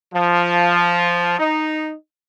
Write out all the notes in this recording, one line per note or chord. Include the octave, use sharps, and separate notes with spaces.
F3
D#4